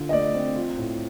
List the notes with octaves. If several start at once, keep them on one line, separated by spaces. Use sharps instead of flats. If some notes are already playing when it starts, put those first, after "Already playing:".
Already playing: D3 F4
D#5
A3 D5
C4
F4
A2